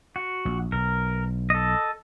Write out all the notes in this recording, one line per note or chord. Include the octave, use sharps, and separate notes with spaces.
F#4
A#1
B1 A#4
A4 D#5